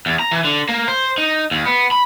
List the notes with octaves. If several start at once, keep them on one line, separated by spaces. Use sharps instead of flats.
E2
A#5
E3
D3
A#3
C5
D#4
D#2
B3
B5